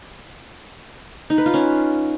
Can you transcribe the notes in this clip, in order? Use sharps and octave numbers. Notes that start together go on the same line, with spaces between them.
D#4
B4
F4
C#4